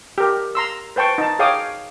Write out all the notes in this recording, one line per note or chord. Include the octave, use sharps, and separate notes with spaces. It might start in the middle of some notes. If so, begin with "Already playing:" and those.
G4 A#4
A#5 C6 E6
B4 C5 G5 A5 C#6
D#4 A5
G#4 C#5 F5 G5 D6 D#6